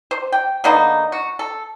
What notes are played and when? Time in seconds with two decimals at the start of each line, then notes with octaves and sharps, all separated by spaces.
0.11 C5
0.32 G5
0.64 D3 A#3 B3 D#4
1.12 F#4
1.39 A4